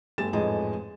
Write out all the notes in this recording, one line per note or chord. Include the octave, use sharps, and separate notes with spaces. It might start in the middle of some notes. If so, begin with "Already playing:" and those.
G1 A3 G4 G#5 A6 E7
A1 F2 G#2 A3 G#4 D#5